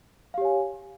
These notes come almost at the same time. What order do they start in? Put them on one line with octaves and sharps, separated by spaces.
F5 G4 C#5 G#5